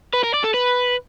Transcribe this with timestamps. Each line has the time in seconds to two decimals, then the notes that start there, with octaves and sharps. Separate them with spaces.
0.14 B4
0.24 A#4
0.34 D5
0.44 A4
0.54 B4